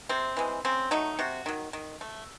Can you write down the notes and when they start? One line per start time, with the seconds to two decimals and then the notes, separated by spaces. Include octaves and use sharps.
0.09 C3 C4
0.37 E3 G#3
0.65 C#3 C4
0.91 F#3 A3 D#4
1.19 C3 F#4
1.46 D#3 F#3
1.73 D#3
2.01 A3